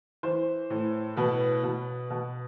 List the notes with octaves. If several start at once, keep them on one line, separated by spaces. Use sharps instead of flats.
E3 C5
A2
B2 B4
B2
B2